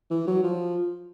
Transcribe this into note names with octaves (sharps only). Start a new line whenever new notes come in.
E3
F#3
F3